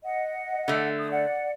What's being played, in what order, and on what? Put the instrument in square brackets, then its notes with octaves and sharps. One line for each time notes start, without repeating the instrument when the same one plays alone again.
[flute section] D#5 F#5
[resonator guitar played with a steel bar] D3 A3
[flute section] D#6
D5 F#5